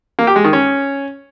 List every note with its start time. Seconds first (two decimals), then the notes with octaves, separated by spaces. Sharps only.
0.19 A#3
0.27 G4
0.36 G#3
0.44 D#3
0.53 C#4